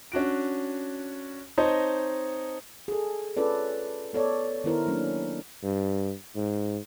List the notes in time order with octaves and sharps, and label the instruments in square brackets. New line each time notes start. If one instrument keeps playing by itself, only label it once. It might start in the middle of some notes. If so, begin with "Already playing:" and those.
[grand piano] C#4 D4 F#4 D7
C4 D#4 C5 C#5 D#5 A5
[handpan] G#4 A4
C#4 F4 A4 B4 D5
B3 A4 C#5 D5
D#3 B3 E4 A#4 C5
F#3 A#3 C#4 D4 E4
[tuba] G2
G#2